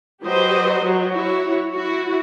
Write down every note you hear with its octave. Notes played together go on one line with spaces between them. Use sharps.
F#3 G4 B4 C5 D#5
F#3
E4 F#4 C#5
E4 F#4